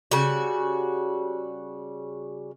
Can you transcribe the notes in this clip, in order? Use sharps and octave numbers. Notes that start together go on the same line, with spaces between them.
C#3 G3 F#4